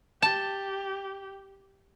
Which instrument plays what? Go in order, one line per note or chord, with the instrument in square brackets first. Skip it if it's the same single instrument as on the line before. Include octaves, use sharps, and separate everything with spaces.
[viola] G4 [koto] A5